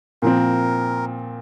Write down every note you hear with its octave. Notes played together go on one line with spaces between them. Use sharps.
A#2 F3 C4 A#4